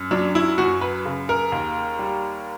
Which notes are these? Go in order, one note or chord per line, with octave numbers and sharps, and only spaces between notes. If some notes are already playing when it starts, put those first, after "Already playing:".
Already playing: F#2
F#3 D4
E4
F#2 F#4
B4
C#3
A#4
D#2
G3